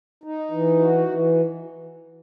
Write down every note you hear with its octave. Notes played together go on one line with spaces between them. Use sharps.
D#4
E3
F#4
E3